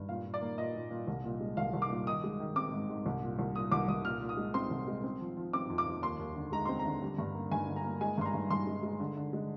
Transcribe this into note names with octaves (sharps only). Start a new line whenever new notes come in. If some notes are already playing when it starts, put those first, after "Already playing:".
Already playing: G2
A#2 F5
A#2
D5
A#3
A#2 D#5
A#2
A#2
C2
A#2
G#3
C2 F5
C2
D6
A#2
D#3 D#6
G#3
D#3
C4 D6
G#2
G#2
C2
A#2
C2
A#2 D#6
C2 D6
C2 D#6
A#2 F6
A#2
D#6
G#3
C4 C6
C2
G#3
C4
F3
F3
C4 D6
F2
D6
F2
D#2 C6
D#2
D3
G#3 A#5
C4 C6
A#5
D3
G3
G2
A#3
G2 G#5
D3
A#5
A#3
G#3 G#5
G2 C6
A#5
G2
G2 C6
G#3
G#3
D3
D3
G#3